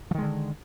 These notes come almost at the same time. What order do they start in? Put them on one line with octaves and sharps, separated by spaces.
F3 D#3 G#3 D3